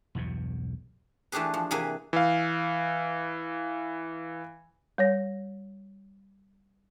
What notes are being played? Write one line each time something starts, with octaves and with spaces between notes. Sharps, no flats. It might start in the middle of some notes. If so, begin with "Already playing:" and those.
B1 E2 G2 B2
E3 A3 D4 G4 G#4 B4
F3
C3 E3 A#3 G#4 B4
E3 F5
G3 C#5 A#6